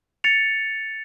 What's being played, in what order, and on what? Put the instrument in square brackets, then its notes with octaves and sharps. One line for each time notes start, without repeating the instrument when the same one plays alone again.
[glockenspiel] A6 C#7 F7